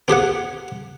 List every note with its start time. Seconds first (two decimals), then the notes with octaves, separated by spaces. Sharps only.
0.08 C4 G4 G#4 F#5